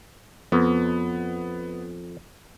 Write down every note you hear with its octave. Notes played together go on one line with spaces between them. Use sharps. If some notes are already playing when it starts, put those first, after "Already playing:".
F2 B3